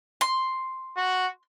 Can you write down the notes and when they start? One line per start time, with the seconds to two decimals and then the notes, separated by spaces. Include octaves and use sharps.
0.21 C6
0.97 F#4